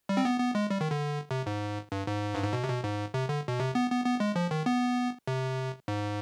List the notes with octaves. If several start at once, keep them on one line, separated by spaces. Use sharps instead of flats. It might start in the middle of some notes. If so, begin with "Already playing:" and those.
G3
C4
B3
B3
G#3
G3
D#3
D3
C3
G#2
G2
G#2
G2
G#2
B2
C3
B2
G#2
C3
D3
B2
C3
B3
B3
B3
G#3
F3
D#3
B3
C3
G#2